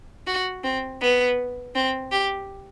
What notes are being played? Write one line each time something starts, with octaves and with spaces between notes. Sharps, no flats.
F#4
C4
B3
C4
G4